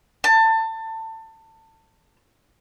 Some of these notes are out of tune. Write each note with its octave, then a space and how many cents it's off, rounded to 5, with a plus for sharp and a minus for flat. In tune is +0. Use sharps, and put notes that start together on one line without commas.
A5 +25